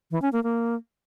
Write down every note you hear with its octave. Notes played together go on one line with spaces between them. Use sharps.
E3
C#4
A#3
A#3